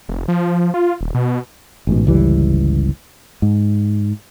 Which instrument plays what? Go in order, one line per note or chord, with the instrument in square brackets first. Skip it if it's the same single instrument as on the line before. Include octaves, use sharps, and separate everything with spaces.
[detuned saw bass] F1
F3
F4
D#1
B2
[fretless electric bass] A1 G#2 B2
G1 C#2 E3 G3
G#2